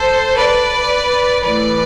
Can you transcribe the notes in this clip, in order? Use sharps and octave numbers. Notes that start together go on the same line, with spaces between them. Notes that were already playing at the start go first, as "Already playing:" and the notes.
Already playing: A4 C5
B4 D5
A2 E3 B4 D5